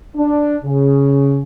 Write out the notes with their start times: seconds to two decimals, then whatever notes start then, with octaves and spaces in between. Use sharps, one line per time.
0.16 D4
0.65 C#3